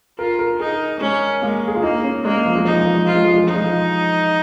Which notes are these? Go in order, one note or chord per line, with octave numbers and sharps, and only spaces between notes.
F4 A#4
A#4
D#4 G#4
G#3 C#4
G#3 A#3
G#4
F4
A#3 D#4
C#4
G#3 A#3
F3
G#3
F3 D#4
G#3
F3
G#3
F3 F4
G#3
F3
G#3
F3 D#4
G#3
F3